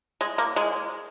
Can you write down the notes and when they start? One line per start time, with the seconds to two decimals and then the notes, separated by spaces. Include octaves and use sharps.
0.21 G#3
0.38 A#3
0.56 G#3